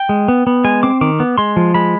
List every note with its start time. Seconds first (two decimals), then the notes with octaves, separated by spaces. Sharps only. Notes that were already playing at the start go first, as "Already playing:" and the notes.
Already playing: G5
0.09 G#3
0.28 B3
0.47 B3
0.64 G#3 G#5
0.83 C4 D6
1.01 D#3 D6
1.20 B3
1.38 G#3 C6
1.56 F3
1.74 G#3 B5